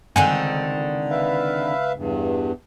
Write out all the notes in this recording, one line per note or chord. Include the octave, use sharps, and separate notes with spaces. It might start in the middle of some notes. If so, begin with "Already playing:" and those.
C#2 D3 D#3 C4 F#5 G#5
B4 E5 F5
E2 G2